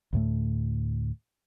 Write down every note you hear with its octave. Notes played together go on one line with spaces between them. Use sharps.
D2 A2 A3